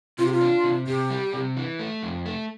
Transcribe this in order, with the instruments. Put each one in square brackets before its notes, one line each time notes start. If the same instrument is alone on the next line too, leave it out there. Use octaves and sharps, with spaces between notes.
[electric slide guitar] C3 [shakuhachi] F4
[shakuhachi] G4
F4
[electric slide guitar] D4
C3
[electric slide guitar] C3 [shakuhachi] G4
[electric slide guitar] G3
C3
E3
A3
F2
A3